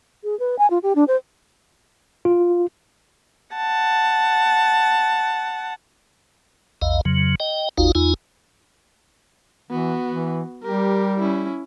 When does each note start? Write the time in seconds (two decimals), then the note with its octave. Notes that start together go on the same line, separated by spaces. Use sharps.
0.24 G#4
0.39 B4
0.59 G#5
0.70 F4
0.83 G4
0.95 D4
1.08 C5
2.25 F4
3.55 F#5 A5
6.82 A#1 E2 D#5 F5
7.05 F2 C#3 F#3
7.40 D#5 G5
7.78 G1 D#2 D#4 F4 F#4 F5
7.95 E2 D#4 F4 G#5
9.71 E3 B3 F#4
10.07 E3
10.63 G3 G4 A#4
11.20 C#4 E4